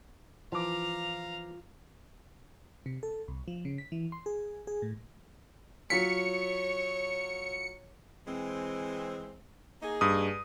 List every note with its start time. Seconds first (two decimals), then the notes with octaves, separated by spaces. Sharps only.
0.52 E3 F3 F4 F5 A#5 D6
2.86 C3
3.03 A4
3.28 C2
3.48 F3
3.65 C#3
3.78 B6
3.92 E3
4.12 C6
4.26 G#4
4.67 G#4
4.82 A2
5.90 F#3 F4 C#5 B6 C#7
8.27 E3 G#3 C4
9.82 A#3 D#4 G#4
10.01 G2 D#6